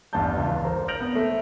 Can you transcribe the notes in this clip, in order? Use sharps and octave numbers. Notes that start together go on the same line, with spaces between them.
A1 E2 G2 D5 A5 G6
C#2
A#4 C5 A#5
F6 G6 A#6 D7 F7 F#7
B3
A3